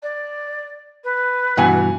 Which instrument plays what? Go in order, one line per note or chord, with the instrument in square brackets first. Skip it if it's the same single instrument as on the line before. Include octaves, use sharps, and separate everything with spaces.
[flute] D5
B4
[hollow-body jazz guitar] G2 B2 E3 [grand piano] F#5 G#5